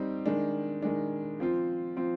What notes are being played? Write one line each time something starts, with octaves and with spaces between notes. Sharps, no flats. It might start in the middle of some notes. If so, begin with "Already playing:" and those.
Already playing: G3 C4 D#4
D#3 G#3 D4
D#3 G#3 D4
F3 C4 F4
F3 C4 F4